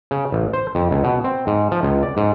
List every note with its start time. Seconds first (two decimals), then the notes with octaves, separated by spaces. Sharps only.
0.11 C#3
0.32 A1
0.53 C5
0.75 F2
0.91 C#2
1.04 B2
1.24 C4
1.47 G#2
1.71 F3
1.83 C#2
2.03 D5
2.17 G#2